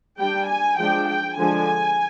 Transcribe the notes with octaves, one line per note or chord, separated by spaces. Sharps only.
G3 D4 G5
G#5
F3 G#3 D4 G5
G5
D3 F3 G#3 D4 G#5